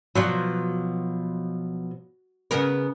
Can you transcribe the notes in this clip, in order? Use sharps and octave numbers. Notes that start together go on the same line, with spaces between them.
B2 F3 F#3 F4
C#3 B3 A#4